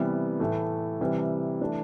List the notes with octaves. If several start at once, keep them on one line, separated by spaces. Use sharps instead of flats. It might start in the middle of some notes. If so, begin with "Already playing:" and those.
Already playing: C3 E3 G3 B3
A2 E3 A3
C3 E3 G3
E3 A3 D4